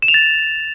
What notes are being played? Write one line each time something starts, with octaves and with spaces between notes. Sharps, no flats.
E7
F7
A6